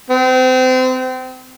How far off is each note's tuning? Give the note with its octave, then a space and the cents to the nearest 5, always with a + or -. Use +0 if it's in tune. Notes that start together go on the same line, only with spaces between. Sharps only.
C4 -30